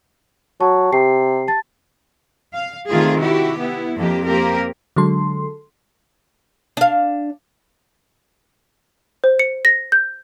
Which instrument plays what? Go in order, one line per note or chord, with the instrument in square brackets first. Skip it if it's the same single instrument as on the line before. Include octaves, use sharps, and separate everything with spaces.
[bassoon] F#3 [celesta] A5 C#6
[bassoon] C3 [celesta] G4 G5 C7
[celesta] A5 A6
[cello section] F5
C3 D#3 A3 F4 G#4
E4 F#4 G4
B3 E4
F2 A#3 G4
A#3 C4 G4 A#4
[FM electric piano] D3 F#3 G#3 A4 C6
[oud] D4 F5
[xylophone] C5
C#7
A#6
G6